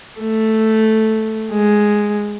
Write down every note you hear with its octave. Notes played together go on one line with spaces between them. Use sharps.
A3
G#3